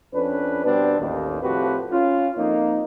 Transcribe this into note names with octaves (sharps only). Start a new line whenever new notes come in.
F2 C#4 D4 B4
B2 G3 B3 C4 D4
A1 D#2
A2 F3 C4 F#4 G4 B4
C#4 F4
F2 A#3 D#4